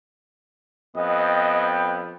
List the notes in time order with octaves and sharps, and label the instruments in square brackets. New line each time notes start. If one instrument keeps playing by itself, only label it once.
[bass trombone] F2 [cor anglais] B3 [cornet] D#5 [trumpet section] G5